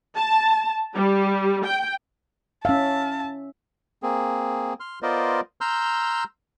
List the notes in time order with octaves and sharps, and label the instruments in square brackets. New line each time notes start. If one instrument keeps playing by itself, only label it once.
[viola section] A5
G3
G5
[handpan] C#4 E5 [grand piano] F5 [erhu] A5
[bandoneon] A#3 C4 G#4
C6 F6
B3 F4 A#4 C5 D5 D#5
A#5 C6 E6 F6 G6